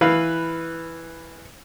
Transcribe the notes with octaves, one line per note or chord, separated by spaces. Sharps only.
E3 B4 F5